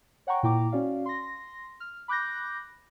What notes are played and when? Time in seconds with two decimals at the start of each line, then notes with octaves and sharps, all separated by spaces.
0.27 C#5 F#5 G5 A#5 C#6
0.43 A#2 E4 G5 A#5 D6
0.72 C#4 F#4 D5 F5
1.06 C6 A#6
1.80 F6
2.08 B5 D6 F#6 G6 A#6